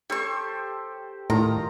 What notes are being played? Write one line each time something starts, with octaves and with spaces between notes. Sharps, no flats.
G4 A4 C5 C#5 C#6
A2 D#3 F4 A#5